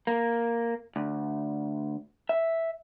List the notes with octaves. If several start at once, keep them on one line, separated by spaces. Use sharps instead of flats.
A#3
D2
E5